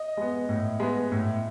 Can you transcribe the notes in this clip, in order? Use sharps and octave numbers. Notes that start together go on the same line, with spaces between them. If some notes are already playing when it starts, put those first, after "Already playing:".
Already playing: D#5
G#3 B3
A2
G#3 B3
A2